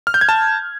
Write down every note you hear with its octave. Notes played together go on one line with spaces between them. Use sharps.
F6
G6
G#6
A5